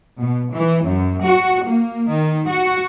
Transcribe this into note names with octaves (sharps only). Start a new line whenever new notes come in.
B2
E3
F#2
F#4
A#3
D#3
F#4